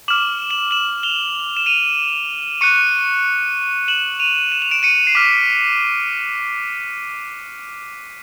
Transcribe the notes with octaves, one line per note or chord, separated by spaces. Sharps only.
D6 F6 E7 F#7
E7 F#7
E7 F#7
F7 G7
E7
D#7 F7
C#6 F#6 C#7 D#7
E7 F#7
D#7 F7
E7
F7
D7 E7
C#7 D#7
C7
D6 F6 B6